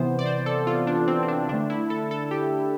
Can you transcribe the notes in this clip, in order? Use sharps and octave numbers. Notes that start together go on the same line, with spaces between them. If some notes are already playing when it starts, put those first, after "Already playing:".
Already playing: C3 E3 B3 C5
D5
C5
A4
F4
D4
C4
C4
D4
D3 A3 D4
E4
A4
A4
G4